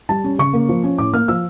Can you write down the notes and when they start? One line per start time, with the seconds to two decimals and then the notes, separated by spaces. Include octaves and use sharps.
0.09 G3 A5
0.24 C#4
0.38 C#3 C#6
0.53 A#3
0.69 F3
0.84 C#4
0.98 A2 D6
1.13 A#3 F6
1.28 F3 E6